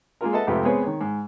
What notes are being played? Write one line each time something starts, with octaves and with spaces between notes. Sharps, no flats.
G#3 A#3 F4 A#4
A4 B4 D#5 E5 F#5 A5
F2 G#2 C3 A3 G4 B4
G#3 B3 C4 G#4 B4 C#5
D#3 C#5
G#2